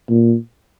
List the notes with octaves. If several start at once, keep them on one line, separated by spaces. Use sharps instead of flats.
A#2